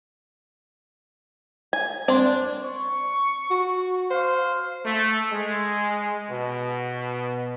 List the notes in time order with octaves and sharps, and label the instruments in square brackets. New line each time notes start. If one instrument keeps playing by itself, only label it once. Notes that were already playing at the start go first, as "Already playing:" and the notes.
[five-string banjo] G#5
[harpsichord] C4 [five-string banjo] D4 [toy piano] D5 C6
[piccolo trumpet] C#6
[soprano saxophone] F#4
[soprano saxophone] C5 [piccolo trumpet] F5
[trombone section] A3
G#3
B2